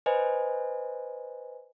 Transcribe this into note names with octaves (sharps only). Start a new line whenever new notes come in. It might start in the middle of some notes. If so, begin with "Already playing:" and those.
B4 C5 D#5 G#5